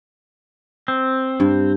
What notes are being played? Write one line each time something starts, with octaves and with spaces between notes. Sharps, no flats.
C4
G2